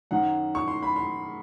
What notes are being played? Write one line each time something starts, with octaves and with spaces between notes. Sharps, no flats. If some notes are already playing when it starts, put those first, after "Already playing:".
F#2 D#3 F#5
C#6
C6
B5
C6